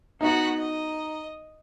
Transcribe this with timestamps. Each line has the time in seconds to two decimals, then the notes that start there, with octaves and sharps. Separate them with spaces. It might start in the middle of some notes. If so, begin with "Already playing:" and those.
0.21 B3 D#4 F#4 F#5
0.58 D#5